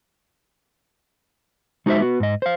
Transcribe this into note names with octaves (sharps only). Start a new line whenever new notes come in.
G#3 D#4 F#4 G#4 C5 E5
B3 F#4
G#2 D#5
C5 F5